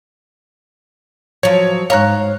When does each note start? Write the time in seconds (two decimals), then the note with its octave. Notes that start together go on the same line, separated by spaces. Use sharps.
1.43 F3 F#3 C#5
1.90 G#2 C#5 F5 A#5 F#6